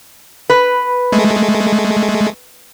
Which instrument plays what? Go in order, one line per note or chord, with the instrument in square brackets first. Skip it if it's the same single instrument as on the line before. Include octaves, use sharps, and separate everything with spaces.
[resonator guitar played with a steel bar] B4
[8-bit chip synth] G#3 A3